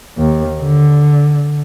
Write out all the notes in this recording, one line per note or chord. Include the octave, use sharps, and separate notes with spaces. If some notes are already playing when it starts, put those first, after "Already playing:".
D#2
D3